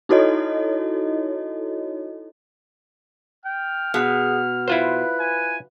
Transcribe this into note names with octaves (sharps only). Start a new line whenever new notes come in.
D#4 E4 F#4 A4 C#5 D#5
G5 F6
B2 G#4
E4 F4 B4 C5
G#5